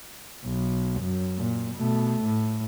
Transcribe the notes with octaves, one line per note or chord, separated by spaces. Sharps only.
B1
F#2
A#2
B2 A3
A2